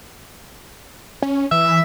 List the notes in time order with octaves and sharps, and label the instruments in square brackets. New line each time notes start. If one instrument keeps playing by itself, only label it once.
[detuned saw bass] C#4
[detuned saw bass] E3 [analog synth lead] E5